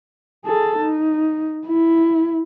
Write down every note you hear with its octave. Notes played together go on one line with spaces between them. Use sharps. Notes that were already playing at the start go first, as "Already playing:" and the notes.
G#4 A4
D#4
E4